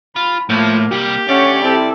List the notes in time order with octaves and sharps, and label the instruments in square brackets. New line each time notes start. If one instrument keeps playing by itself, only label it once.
[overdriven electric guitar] F4 [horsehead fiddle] B5
[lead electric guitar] A2 [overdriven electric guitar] F3 [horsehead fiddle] A#3
[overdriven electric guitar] C2 G3 [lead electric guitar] G4
[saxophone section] D3 A3 C#4 [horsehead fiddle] C#5 F#5 [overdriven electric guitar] D5
[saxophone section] C3 G3 E4 [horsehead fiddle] C4 A4